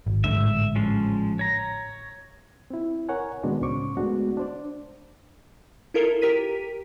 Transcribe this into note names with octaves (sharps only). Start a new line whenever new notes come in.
G#1
A1 G#2 D3 E5
F3 G#3 C#4
C#5 A#5
C4 E4
A#4 C#5 F#5 G#5
B2 D#3 G#3 B3 D4 F#4
C#2 A2 C#4 C5 C#6 D6
G#3 A3 B3 D4 F#4
D4 C5 D5
E4 F4 A4 A#4
G4 A#4 B6 D#7